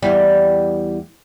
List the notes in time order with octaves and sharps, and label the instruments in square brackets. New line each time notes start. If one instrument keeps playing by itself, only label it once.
[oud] E2 G3